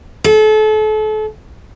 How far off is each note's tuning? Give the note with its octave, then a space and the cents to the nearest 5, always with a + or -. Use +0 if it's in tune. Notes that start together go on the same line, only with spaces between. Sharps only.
A4 -35